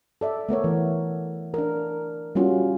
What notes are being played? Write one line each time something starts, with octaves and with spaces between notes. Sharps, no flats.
A4 D5 E5
A3 B3 A#4 C#5
E3
D4 A#4
G3 A#3 C#4 F4 F#4